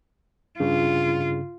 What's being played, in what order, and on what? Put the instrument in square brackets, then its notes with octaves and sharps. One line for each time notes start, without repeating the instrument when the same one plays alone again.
[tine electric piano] G2 C#3 [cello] F4